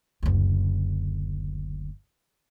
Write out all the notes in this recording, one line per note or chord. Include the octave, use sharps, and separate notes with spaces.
F#1 D2